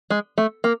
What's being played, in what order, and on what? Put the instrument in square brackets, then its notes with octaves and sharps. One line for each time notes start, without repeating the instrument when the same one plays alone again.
[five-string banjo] G#3
A3
A#3